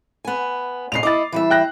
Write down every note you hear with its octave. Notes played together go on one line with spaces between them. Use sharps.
B3 G#5
A#2 C#3 D#5 C7 F7
E4 D#5 D6 A6
E3 G3 E5
G5 F#6 A#6